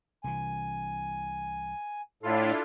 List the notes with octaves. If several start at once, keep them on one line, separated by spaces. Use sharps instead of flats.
C2 E3 G#5
A2 D4 E4 F4 A4